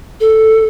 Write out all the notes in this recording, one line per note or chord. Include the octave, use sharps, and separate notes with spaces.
A4